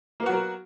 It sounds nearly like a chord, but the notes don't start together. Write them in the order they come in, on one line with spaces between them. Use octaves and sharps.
A#3 B3 F#4 F#3 A#4